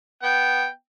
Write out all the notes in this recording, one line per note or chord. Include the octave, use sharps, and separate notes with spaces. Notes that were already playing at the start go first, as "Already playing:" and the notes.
B3 G5